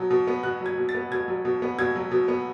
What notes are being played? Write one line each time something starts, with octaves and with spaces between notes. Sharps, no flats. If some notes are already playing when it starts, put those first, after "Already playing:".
Already playing: B2 F#3
B2
B3
B2 F#6
F#3 G#6
B2
A6
B3
B2 G#6
F#3
B2
B3
B2 G#6
F#3
B2
B3